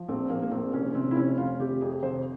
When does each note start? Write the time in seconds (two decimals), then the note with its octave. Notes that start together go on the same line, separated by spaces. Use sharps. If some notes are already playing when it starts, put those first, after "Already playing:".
Already playing: F3
0.08 A#1 C4
0.30 A#1 A#3
0.42 A#3
0.51 A#1 C4
0.73 F1 C#4
0.91 C#4
0.94 C3 C4
1.11 E4
1.16 F1 C#4
1.38 F1 F4
1.59 C3 G4
1.81 F2 G#4
2.03 C3 C5